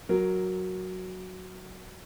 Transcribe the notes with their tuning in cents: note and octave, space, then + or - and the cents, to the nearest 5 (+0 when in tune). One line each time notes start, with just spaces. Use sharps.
F#3 +0 A#4 +0